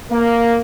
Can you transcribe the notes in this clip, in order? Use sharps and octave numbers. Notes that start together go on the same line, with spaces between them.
A#3